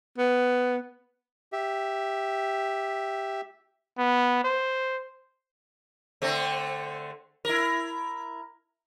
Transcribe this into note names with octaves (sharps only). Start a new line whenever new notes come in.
B3
G4 E5
B3
C5
D3 A3 C4
E4 A#4